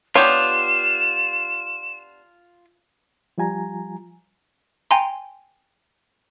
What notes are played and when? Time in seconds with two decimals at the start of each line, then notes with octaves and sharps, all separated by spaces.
0.15 B3 D4 F4 G4 C#5 E7
3.38 F3 G3 F4 G#5 A#5
4.91 G5 G#5 A#5 C6